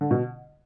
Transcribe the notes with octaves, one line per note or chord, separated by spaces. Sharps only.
D3
B2